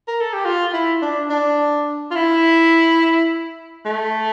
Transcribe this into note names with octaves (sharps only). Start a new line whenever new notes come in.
A#4
A4
G4
F4
E4
D4
D4
F4
E4
A3